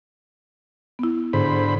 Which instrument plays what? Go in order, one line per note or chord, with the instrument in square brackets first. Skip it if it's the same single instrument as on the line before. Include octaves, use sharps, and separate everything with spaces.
[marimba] B3 E4
[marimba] G#2 [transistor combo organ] D3 C5 B5